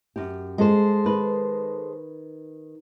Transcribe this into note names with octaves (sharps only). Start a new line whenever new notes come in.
F#2 G4
G#3 A4 C5
D#3 B4